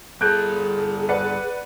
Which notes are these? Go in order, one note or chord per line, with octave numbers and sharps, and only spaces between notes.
G2 G#4 A4 F#6 G6 D7
B4 D5 F#5